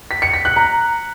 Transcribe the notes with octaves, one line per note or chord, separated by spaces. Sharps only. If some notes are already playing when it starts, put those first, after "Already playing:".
B6
C#7
B6
F#6
A#5